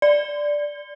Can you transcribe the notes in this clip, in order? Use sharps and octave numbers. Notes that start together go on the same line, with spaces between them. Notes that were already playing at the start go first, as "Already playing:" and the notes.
D5